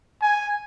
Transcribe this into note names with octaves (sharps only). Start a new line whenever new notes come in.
G#5